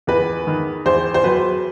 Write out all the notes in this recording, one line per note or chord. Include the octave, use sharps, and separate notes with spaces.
E2 B4
D#3
E2 C5
C5
F#3 B4